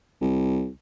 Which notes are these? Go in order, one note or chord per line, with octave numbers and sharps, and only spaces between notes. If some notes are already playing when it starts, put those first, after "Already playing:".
C2